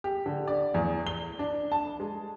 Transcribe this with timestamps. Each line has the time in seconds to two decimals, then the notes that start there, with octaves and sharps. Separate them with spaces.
0.04 G4
0.26 D3
0.48 D5
0.74 E2
1.07 G7
1.39 D4
1.72 A5
2.00 G#3